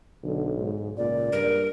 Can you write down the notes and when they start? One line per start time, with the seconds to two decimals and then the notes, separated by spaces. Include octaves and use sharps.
0.23 B1 D3
0.57 G#2
0.97 C#2 A#2 D5
1.32 G2 A#4